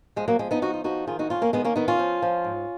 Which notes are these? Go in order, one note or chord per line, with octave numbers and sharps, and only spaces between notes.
F3 G#3
F#3 A#3
F3 G#3
B3 D#4
F3 D#4 F#4
F4
F3 D#4 F#4
D#3 F4 G#4
D#4 F#4
F2 C#4 F4
A#3 C#4
D#3 G#3 B3
A#3 C#4
D#3 B3 D#4
C#4 F4
F3
F3
G#2